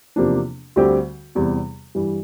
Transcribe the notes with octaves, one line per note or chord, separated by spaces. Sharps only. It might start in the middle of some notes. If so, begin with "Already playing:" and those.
E2 C3 F3 A#3 D4
D2 D3 G3 C4 G4
E2 C3 G3
G2 E3 G3